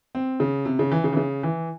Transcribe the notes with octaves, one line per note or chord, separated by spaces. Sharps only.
C4
C#3
C3
C#3
E3
C#3
E3
C#3
E3